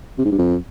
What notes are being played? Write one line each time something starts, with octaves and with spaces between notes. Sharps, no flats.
C3
G#2
G2
F2